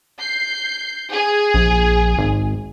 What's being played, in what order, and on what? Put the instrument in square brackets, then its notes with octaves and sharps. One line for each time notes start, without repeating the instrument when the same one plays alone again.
[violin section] G6 C7
G#4
[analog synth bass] A#1
G#1